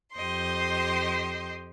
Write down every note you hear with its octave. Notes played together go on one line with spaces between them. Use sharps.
F2 G4 C5 D#5 C6